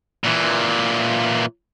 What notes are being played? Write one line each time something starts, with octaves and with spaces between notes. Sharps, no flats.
A#2 E3